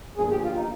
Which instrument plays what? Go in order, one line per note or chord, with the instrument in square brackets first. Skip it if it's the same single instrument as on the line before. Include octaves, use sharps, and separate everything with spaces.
[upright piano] G1 G2 F3 A#3 [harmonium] G#4
[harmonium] G4
F4
D#4